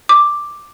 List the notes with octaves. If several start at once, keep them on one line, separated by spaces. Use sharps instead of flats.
D6